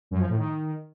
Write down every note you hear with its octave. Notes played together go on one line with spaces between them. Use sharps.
F#2
F3
A2
D#3